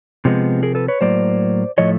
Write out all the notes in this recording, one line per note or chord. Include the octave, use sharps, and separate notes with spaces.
C3 F3 G#3 B3
G#4 A#4
A4 B4
B4 C#5
A2 F#3 A#3 C5 D5
A2 F3 A3 C#5 D#5